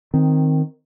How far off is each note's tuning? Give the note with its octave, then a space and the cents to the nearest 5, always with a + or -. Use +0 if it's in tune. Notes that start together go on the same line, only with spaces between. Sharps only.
D#3 +0 C4 +0